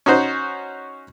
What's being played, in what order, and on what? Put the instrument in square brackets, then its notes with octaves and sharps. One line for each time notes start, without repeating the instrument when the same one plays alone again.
[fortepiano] C#4 D#4 F#4 C5